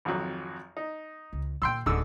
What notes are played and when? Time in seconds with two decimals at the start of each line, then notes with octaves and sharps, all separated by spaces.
0.05 G#1 F2 F#3
0.77 D#4
1.33 C#2
1.62 A#2 D#3 G5 C6 E6
1.86 D1 G#2 D3 E6